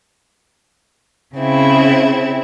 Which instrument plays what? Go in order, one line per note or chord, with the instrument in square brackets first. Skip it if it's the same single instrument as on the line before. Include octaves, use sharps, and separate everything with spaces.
[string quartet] C#3 C4 E4